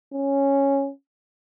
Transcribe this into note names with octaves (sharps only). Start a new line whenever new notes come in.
C#4